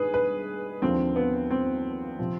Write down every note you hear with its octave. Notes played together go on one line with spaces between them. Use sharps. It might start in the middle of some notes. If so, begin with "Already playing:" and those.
Already playing: G2 D#3 G#4 B4
B4
D#2 D3 F3 C4
B3
C4
C3 F3